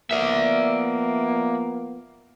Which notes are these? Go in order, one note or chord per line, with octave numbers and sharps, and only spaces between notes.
F3 A#3 B3 D5 E5